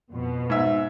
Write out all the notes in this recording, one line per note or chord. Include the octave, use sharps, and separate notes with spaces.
F2 B2
G#2 E5